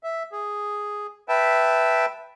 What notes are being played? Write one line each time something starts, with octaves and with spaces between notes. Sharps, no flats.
E5
G#4
B4 E5 G5 A5